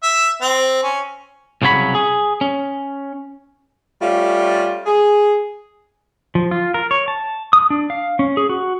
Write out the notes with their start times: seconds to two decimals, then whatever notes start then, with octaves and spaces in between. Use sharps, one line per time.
0.03 E5
0.41 C4
0.83 C#4
1.62 C2 C#3 F#3 C#5 B5
1.95 G#4
2.41 C#4
4.02 G3 A3 C#4 F4
4.86 G#4
6.35 F3
6.51 F4
6.74 A#4
6.91 C#5
7.08 A5
7.53 D#6
7.70 D4
7.90 F5
8.19 C#4
8.37 G#4
8.49 F#4